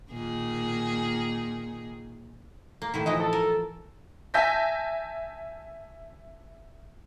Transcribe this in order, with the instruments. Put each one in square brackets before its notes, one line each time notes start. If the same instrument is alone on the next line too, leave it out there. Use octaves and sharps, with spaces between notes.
[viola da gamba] A#2 D#3 G#4
[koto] A#3
A2 D#3 E4
[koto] E3 F3 E4 [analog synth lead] D#5
[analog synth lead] A4
[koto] A#4
[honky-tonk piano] E5 G#5 A5 G6 A#6 B6